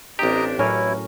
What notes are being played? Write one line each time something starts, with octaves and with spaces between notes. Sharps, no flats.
A1 C4 D4 G4 D#5 A#5
A2 F#3 C#4 E4 A#4